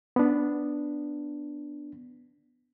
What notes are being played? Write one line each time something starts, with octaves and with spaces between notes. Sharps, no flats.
B3 D4